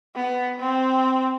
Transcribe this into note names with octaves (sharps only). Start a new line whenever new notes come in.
B3
C4